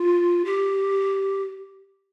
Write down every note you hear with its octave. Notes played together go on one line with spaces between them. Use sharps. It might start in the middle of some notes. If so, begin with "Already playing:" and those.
Already playing: F4
G4